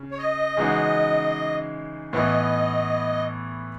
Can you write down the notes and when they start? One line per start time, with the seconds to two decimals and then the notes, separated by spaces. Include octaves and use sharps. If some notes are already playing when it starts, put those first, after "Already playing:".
Already playing: C#3
0.11 C#5
0.18 D#5
0.57 C#3 E3 G#3 D#4 F#4
2.13 A2 E3 B3 D#5